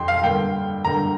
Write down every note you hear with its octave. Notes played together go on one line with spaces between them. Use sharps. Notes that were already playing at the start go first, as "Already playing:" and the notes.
Already playing: F2 G5 C6
F5
G2 D3 A#3 G5
G2 D3 A#3 A#5